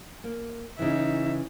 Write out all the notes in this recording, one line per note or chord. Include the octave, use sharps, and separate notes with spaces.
A#3
C#3 E3 D#4 E5